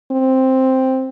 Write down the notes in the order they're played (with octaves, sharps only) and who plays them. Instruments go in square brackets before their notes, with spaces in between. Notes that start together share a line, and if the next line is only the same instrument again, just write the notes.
[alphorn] C4